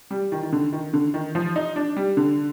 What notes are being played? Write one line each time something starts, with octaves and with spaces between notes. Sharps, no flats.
G3
D#3
D#3
D3
D#3
D3
D#3
F3
D#4
D4
G3
D3